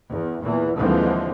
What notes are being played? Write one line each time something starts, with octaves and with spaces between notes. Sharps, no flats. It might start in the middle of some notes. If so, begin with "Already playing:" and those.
E2
E2 A#2 E3
D#2 D3 E3 F3 G#3 C4